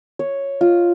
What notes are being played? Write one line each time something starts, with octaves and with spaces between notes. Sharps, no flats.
C#5
F4